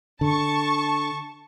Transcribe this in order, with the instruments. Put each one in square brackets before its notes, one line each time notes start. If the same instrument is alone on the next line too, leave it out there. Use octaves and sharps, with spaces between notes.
[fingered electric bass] D3 [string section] A5 C#6